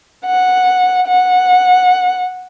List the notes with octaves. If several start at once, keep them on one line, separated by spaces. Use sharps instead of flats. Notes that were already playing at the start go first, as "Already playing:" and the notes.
F#5
F#5